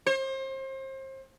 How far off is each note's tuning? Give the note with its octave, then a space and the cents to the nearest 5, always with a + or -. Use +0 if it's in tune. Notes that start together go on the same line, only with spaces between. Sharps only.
C5 +35